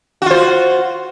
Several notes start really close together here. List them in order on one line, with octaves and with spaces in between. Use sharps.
F#4 F4 C5